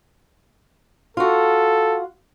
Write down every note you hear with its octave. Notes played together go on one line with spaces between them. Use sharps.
F4 F#4 A4